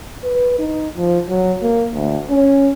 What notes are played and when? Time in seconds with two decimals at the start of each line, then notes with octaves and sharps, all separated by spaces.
0.24 B4
0.59 D#4
0.97 F3
1.29 F#3
1.62 A#3
1.94 D2
2.30 C#4